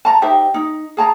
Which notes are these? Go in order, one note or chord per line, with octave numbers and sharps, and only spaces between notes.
A5 A#5
D#4 G4 C5 E5
D#4
G#4 A5 A#5